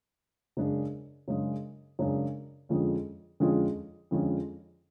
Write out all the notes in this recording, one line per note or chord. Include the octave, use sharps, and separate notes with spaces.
F#2 C#3 G#3 D4 G#4
F#2 C#3 G#3 D4 G#4
F#2 C#3 G#3 D4 G#4
F2 D3 G#3 C#4 F4
F2 D3 G#3 C#4 F4
F2 D3 G#3 C#4 F4